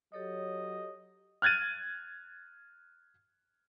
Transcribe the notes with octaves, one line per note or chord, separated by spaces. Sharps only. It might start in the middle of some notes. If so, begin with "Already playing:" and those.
F#3 G4 A4 C#5 D#5
F6 F#6 G#6 A6 D#7